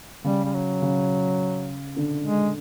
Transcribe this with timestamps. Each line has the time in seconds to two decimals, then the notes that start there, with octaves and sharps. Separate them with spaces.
0.24 C#3 G3
0.45 G3
0.54 F#3
0.82 C#3
1.96 D3
2.24 G#3